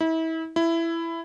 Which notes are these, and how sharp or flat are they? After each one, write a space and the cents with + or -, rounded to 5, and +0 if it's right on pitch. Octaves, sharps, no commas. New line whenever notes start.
E4 -35
E4 +10